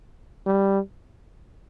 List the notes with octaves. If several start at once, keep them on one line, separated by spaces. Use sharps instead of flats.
G3